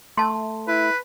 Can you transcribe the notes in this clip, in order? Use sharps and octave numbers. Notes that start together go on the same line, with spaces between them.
A3 A5 C6
E4 B4